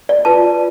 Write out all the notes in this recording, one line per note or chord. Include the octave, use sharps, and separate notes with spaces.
D5
F4 B4 A5